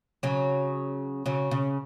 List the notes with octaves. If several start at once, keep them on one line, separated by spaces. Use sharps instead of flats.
C#3 F#3
C#3 F#3
C#3